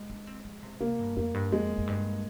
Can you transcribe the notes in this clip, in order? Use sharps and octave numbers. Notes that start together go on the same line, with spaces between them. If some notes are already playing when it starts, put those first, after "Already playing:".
Already playing: G#3
D4
C4
F3
C3
C3 A#3
G2
F2 A#3
G2
F2 G#3
F2
G2